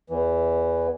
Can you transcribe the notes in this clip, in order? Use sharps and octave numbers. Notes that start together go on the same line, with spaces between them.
E2 E3